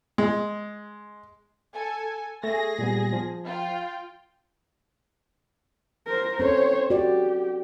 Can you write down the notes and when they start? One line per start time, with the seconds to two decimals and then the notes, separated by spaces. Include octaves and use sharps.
0.18 G#3
1.74 A4 G#5
2.44 A3 G#4 A#6
2.79 A#2 G3 B3
3.13 F3
3.45 F4 G5
6.07 A#4 C5
6.39 C4 C#4 A4 C5 C#5
6.90 F#4 G4 D5